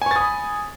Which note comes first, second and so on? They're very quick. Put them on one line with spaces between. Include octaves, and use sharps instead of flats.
G#5 C#6 A6 D#6 B5